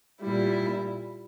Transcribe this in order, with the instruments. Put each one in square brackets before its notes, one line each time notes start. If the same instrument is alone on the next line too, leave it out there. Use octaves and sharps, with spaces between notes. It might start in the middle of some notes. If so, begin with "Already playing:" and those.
[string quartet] A#2 G3 E4